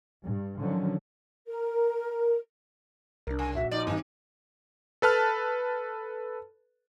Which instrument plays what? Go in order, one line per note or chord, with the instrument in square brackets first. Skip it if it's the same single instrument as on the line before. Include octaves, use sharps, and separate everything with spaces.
[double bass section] G2
D3 D#3 F3 F#3 C#4
[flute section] A#4
[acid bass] C2 [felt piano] D4 A#4
[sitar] C#3 [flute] G#5
[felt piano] A#1 F#4 [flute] E5
[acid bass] F3 [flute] D#4 [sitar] D5
[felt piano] G#1 G2 [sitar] D#3
[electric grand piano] A4 B4 A5 F6